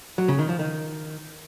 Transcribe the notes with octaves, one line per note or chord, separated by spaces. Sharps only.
F#3
C#3
D#3
F3
D#3